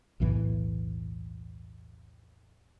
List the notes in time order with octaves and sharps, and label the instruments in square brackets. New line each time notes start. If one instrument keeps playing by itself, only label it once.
[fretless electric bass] B1 E2 A2 E3